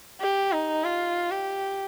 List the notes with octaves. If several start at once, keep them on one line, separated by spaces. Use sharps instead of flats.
G4
D#4
F4
G4